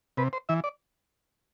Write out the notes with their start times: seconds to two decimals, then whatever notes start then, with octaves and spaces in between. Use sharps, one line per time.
0.17 C3 B4
0.33 C5
0.49 E3 E5
0.64 D5